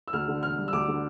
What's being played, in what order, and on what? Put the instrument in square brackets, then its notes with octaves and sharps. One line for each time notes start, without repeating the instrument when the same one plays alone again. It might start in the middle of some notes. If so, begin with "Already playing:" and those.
[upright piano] E6
D2 F6
D3
E1 F6
G3
E6
D2 D6
D3